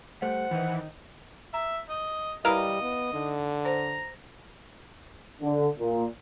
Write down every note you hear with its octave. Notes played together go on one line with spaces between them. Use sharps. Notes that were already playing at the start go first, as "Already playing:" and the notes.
G3 A3 C5 F#5
D#3 E3 D#4
E5 A#5
D#5
G3 E4 A#4 B4 D#5 F5 B5
B3
D3 D#4
C5 A#5
D3
A#2